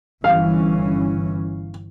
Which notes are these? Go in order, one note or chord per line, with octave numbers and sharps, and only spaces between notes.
G1 E3 C#4 F5